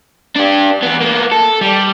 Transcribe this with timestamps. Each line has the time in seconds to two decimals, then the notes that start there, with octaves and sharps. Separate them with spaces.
0.36 D4 G4
0.83 E2 B3
1.01 A#3 B3
1.32 A4
1.61 G3